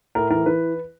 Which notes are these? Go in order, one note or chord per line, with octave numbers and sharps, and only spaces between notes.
A2 A#4
E3 A#4
E3 B4